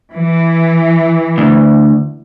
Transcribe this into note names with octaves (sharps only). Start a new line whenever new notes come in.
E3
D2